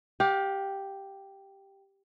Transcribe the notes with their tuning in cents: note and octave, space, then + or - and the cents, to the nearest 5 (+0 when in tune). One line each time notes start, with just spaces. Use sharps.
G4 +0 F5 +35